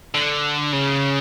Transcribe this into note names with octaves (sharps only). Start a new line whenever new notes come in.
D3
C#3